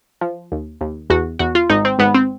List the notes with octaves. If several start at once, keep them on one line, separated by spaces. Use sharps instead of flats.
F3
D#2
D#2
E2 F#4
E2 F#4
F4
G#1 D#4
C4
G#1 B3
C4